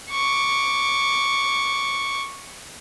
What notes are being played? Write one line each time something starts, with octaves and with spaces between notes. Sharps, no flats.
C#6 D6